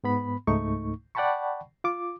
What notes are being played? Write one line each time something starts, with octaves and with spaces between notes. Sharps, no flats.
G#2 B3 B5
C#2 G#2 A3 D#4 C#6
D5 F#5 G5 A5 B5 C#6
F4 D6